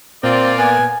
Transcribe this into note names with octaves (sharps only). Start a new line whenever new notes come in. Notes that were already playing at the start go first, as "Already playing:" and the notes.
A#2 C4 F4 D5
B3 G#5